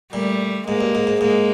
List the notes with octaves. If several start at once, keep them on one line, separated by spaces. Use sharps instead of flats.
A#2 G3 A3
G#2 G#3 A#3
G2
G#2
G#2
G#2 G#3 A#3